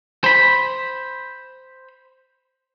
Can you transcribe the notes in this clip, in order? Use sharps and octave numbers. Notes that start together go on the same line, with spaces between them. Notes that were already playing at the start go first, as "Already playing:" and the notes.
C5 B5